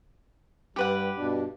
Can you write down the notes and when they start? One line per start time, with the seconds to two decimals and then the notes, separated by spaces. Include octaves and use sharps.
0.76 G2 G3 G4 B4 F#5
1.17 G2 B2 D4